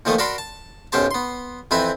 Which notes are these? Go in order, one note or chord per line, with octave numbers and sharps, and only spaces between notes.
A#2 D#3 F3 A3 A#3 A4
F#4 A#4 D5 A5 B5 C6
A5
B1 F#2 C#4 G4 C5 A5
B3 C6
F2 E3 C4 E4 B4 E5